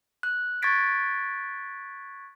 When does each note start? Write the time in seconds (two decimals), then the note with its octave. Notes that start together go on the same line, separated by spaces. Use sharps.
0.23 F#6
0.62 C#6 F#6 G#6 A6 B6 D7